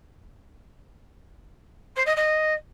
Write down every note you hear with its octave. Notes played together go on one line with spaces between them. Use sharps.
C5
D#5
D#5